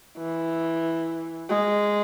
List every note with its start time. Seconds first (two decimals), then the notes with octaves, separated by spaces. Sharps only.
0.18 E3
1.49 G#3